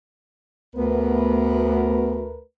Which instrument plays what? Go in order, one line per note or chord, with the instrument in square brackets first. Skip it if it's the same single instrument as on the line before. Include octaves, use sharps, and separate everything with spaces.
[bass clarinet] D2 [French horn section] A3 A#4 B4 [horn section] B3